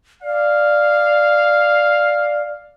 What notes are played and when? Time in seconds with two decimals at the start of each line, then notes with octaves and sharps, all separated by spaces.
0.23 D5 F5